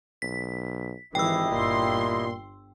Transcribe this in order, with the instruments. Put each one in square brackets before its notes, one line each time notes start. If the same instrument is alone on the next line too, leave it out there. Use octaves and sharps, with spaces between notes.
[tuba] B1 [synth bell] B6
[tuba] G#1 [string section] E3 [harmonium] E4 G4 D#5 [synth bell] G5 E6
[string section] G1 C6 [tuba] A#2